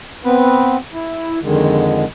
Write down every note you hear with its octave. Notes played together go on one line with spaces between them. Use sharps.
B3 C4 B4
E4
F2 D3 D#3 G#3